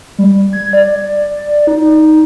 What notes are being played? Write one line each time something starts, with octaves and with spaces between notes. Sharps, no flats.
G3
G#6
D5
D#4